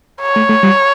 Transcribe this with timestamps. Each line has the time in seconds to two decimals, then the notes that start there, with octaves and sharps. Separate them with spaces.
0.22 C#5
0.36 A3
0.49 A3
0.63 G3